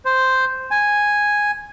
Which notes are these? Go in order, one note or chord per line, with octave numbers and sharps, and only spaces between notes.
C5
G#5